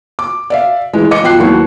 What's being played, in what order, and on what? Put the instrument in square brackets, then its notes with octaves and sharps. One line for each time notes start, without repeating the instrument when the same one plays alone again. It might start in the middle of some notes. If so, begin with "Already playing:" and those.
[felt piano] D6
D5 E5 F5
E3 G#3
D#5 D6 C#7
B2 F3 G5 F#6 C7
D#2 E3 F#3 C#6